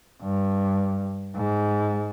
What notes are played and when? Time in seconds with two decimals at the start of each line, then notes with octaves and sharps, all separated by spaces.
0.22 G2
1.36 G#2